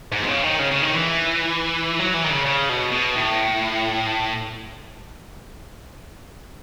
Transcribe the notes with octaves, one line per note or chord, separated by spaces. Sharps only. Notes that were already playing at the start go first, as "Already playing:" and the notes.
G#2
B2
C#3
D#3
C#3
C#3
D#3
E3
F#3
E3
D#3
C#3
C#3
B2
B2
A2